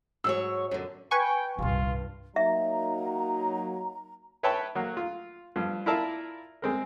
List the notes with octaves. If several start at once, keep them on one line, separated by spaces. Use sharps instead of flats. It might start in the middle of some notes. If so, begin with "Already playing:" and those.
G#2 F#3 C#5 E6
F#2 D3
B4 G5 G#5 C#6
D#1 C2 G2 F4
F#3 A#3 D#4 E5 A#5
B4 C#5 E5 G5 A5 B5
F#3 A#3
F4
G2 F3
E4 F4 A#4 D5 E5 A5
G#3 C4 A#4